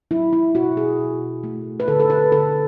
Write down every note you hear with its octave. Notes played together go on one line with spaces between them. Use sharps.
F#3 E4
E4
B2 F#4
G#4
B2
A3
B4
D3 A4
A4
B4
D3 A4